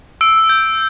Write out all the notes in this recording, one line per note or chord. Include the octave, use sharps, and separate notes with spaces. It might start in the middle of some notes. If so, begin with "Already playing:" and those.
E6 D7
G6